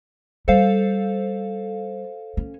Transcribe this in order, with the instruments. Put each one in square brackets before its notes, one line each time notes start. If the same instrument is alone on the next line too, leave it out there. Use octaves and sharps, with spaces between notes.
[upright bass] G3 [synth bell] A4 C5 F5
[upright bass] C#4